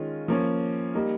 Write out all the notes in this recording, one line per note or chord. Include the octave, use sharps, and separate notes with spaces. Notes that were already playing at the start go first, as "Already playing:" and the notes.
Already playing: D#3 G#3 C#4 F4
F3 A#3 C#4
G3 A#3 D#4